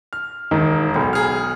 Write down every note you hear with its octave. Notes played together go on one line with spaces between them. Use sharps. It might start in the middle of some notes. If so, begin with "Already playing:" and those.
F6
E1 D#3
B1
G#4 F6